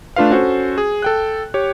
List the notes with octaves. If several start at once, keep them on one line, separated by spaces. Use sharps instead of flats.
A3 D4 F4 B4 F5
C#4 F#4 A4 C5
G#4
A4 G5 F#6
G4 C#5